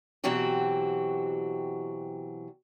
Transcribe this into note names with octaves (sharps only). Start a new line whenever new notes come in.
B2 E3 F#3 C4 F#4 G4